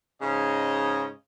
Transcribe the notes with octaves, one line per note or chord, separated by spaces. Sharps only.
G#2 C#3 C#5 D#5